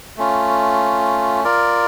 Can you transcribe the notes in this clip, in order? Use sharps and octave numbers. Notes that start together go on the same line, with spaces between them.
A3 C#4 F4
F4 A#4 D5